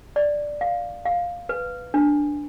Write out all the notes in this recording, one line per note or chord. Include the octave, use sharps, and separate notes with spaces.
D5
F5
F5
B4
D4